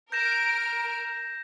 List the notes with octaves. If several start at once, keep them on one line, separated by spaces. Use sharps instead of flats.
A#4 F6 G6 A#6 D7 E7